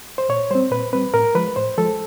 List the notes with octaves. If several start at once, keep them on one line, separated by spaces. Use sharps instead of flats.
C5
A#2 C#5
G3 C4 C5
A#2 B4
G3 C4 B4
A2 A#4
F3 G#3 B4
A2 C5
F3 G#3 A4